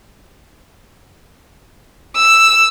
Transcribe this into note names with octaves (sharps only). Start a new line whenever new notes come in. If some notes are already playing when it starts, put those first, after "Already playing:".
E6